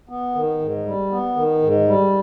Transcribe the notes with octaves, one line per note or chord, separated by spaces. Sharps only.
B3
D#3
G#2
G3
B3
D#3
G#2
G3